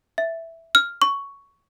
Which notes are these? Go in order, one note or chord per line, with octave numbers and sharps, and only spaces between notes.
E5
F6
C#6